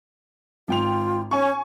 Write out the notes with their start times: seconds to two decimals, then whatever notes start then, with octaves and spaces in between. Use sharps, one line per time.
0.68 G#1 F4 G5 F7
1.31 C#4 G#5 C#6